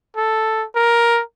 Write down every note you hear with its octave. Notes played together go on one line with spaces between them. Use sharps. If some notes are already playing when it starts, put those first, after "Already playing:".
A4
A#4